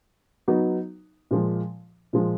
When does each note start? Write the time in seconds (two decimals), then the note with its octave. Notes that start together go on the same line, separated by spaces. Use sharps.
0.48 F#3 B3 D#4 F#4
1.31 A#2 F3 G#3
2.13 A#2 F3 G#3